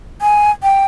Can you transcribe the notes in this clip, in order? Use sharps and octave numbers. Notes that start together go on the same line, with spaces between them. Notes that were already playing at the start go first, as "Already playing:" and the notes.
G#5
G5